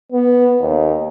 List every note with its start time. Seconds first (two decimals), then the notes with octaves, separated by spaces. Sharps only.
0.12 B3
0.61 D#2